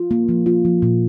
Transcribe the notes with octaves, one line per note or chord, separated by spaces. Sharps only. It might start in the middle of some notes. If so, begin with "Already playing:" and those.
Already playing: F4
A#3
F3
F4
F3
A#2